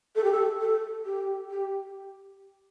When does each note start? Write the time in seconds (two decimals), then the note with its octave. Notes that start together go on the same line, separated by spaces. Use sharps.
0.16 A4
0.24 G4
0.32 A4
0.60 A4
1.05 G4
1.50 G4